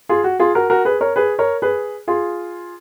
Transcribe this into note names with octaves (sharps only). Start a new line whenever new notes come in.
F4 G#4
F#4
F4 G#4
F#4 A#4
F#4 A#4
G#4 B4
A#4 C#5
G#4 B4
A#4 C#5
G#4 B4
F4 G#4